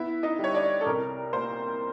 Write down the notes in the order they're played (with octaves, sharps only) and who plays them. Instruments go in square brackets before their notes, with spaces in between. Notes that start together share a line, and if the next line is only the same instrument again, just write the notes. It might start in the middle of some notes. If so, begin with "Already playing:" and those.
Already playing: [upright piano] B3 E4 E5
D#4 D#5
G3 C#5
D4 D5
A4
C2 A#4
A#2 C5